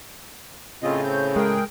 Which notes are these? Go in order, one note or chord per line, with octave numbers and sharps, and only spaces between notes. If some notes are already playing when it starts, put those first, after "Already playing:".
A2 C#3 C4 F4 D#5
C4 G6
G#3 G#4 A#4 G5